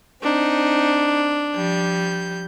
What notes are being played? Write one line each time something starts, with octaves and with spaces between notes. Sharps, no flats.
C4 D4 D#4
F3 G3 G6